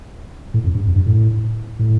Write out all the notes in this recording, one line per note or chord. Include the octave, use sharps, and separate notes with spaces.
A2
F2
G2
F2
G2
A2
A2